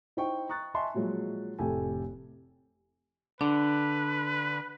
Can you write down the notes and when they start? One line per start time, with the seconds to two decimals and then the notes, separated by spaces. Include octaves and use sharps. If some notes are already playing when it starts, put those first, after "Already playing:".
0.17 D#4 E4 C5 G5 C#6
0.49 A#5 C#6 D#6 F#6 A6
0.74 D#5 E5 G#5 A5 C6 C#6
0.94 A#2 F3 F#3 G#3
1.59 F1 A2 C3 G4 A4 G#5
3.41 D3 D4 B4